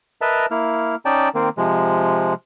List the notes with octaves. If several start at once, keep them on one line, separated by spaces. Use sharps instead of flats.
A#4 B4 D#5 E5 A5 A#5
A#3 E4 F6
C#4 D#4 D5 G5 A5
D#3 A#3 C4
C3 F3 G#3